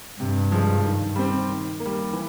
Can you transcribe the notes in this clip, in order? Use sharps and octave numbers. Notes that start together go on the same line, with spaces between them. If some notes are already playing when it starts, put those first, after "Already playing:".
G2 C3
F3 G#3
D#3
G3 C4
D#3
A#3
G3
E3